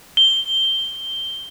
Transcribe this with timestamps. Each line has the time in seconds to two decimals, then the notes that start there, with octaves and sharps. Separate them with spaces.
0.17 G7